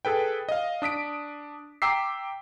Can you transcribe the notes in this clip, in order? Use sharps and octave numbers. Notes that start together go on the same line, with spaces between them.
G#4 A4 B4 G5
D#5 F5
D4 D#6 B6 D7
G5 A#5 D6 E6 B6 C7